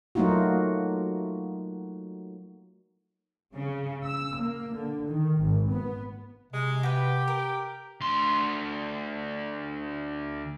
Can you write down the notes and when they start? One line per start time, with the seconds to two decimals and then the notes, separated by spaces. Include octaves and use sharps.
0.15 F#3 A3 A#3 D#4 F4 F#4
3.55 C#3
4.04 E6
4.39 A#3
4.75 D3
5.07 D#3
5.41 G#1
5.71 B3
6.52 C3 G#3
6.83 F#4 G4 B4
7.28 A#4
8.01 D2 C6